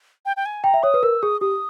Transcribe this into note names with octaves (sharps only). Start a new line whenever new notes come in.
G5
G5
G#5
G5 A#5
E5
C#5 D#6
B4
A#4 E6
G#4 D#6
G4 D#6